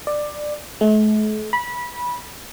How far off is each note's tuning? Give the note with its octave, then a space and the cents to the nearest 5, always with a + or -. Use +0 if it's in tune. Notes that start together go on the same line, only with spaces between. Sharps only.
D5 +15
A3 -45
B5 -20